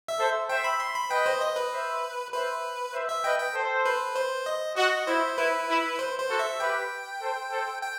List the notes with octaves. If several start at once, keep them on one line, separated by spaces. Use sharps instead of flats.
E5
A4 C5
C5 E5 G5
B5
C6
B5
B4 D#5 G5
C5
D#5
B4
C5 E5
B4 C5 E5
C5 E5
E5
B4 D#5 G5
G5
A4 C5
B4
C5
D#5
F#4 D#5
E4 C5
E4 B4
E4
C5
C5
F#4 A4
E5
G4 B4 G5
A4 C5
A4 C5
G5